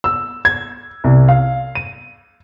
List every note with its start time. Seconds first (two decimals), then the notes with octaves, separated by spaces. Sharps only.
0.04 E6
0.45 G#6
1.04 C2
1.29 F5
1.75 D#7